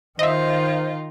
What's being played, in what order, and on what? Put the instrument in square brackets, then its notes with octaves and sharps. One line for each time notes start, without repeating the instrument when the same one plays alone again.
[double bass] D#3 [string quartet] D#4 F4 [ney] C5 [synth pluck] D#5 E5